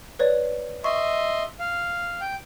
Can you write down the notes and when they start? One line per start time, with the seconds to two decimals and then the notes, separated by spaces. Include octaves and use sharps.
0.19 B4 C#5 D5
0.84 D#5 E5 C6 C#6
1.59 F5
2.21 G5